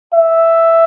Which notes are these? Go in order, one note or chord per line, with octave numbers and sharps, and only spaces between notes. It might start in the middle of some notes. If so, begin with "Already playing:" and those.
E5